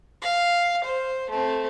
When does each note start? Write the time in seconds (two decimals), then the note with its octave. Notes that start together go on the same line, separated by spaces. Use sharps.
0.22 F5
0.84 C5
1.29 A3 C4